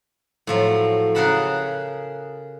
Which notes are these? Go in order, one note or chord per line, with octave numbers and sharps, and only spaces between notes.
A2 F3 F#3
C#3 G#4 A#4 F#5 A5 B5